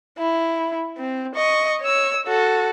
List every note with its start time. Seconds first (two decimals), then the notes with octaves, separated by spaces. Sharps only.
0.18 E4
0.97 C4
1.35 D#5 C#6
1.81 C#5 E6
2.26 F#4 A4